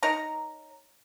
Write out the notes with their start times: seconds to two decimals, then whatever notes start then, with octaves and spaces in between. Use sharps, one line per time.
0.03 D#4 A#4 C#5 A#5